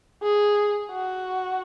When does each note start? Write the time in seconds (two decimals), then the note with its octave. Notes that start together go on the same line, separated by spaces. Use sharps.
0.22 G#4
0.92 F#4